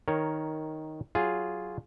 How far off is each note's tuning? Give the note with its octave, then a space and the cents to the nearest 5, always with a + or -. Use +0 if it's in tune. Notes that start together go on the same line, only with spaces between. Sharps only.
D#3 +5 A#4 +0 C#5 +0
F#3 +10 F4 +0 G#4 +0